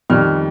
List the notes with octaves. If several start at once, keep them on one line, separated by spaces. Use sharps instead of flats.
F2 D#3 G3 F6